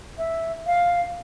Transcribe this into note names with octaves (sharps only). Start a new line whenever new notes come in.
E5
F5